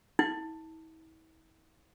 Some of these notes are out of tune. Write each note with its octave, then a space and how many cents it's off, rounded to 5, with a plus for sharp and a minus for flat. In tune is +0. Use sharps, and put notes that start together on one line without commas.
E4 -45